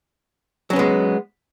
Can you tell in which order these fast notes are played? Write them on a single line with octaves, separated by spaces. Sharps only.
F#3 C#4 B3 G#3